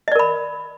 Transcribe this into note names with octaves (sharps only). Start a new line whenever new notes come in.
A#4 D5 D#5 B5